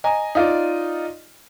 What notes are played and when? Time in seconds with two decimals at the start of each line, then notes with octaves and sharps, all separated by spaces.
0.04 D#5 G#5 A#5
0.35 D#4 F4 D5